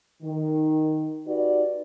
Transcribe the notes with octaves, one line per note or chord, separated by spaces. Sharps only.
D#3
D#4 F#4 G4 B4 D5